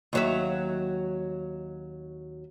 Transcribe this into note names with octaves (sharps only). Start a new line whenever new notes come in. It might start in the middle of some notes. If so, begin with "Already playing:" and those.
D#2 F#3 E5